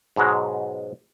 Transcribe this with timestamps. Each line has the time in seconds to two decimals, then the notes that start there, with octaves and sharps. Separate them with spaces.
0.16 G#2 B2 F#3 G#3